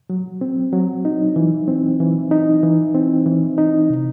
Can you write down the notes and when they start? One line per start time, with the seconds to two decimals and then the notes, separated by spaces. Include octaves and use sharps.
0.10 F#3
0.41 C4
0.73 F#3
1.05 D#4
1.36 E3
1.68 C4
2.00 E3
2.31 D#4
2.63 E3
2.95 C4
3.26 E3
3.58 D#4
3.90 C3